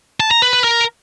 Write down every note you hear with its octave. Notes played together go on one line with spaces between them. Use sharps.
A5
A#5
B4
B4
A#4